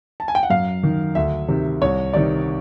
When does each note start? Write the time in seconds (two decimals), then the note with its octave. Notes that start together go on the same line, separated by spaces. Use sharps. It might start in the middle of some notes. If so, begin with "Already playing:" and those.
0.20 A5
0.28 G#5
0.35 G5
0.43 F#5
0.50 F#2 F5
0.83 D#3
1.15 D2 E5
1.48 C3 D#3
1.81 C2 C#5
2.14 C3 D#3 D5